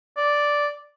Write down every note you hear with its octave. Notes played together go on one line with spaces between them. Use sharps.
D5